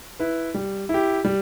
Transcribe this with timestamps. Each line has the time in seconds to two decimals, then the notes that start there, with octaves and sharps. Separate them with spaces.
0.19 E4 B4
0.55 G3
0.89 E4
0.94 G4
1.25 G3